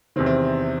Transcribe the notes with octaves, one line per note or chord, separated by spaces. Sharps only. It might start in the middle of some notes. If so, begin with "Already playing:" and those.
E2 C3 D#3 C4
C4